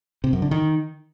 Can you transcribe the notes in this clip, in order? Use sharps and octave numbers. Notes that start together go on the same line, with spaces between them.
C3
F#2
D3
D#3